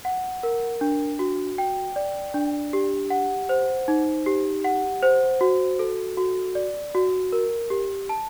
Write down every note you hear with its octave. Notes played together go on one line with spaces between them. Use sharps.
F#5
A#4
D4
F#4
G5
D5
D4
G4
F#5
C5
D#4
G4
F#5
C5
F#4
A4
F#4
D5
F#4
A#4
G4
A5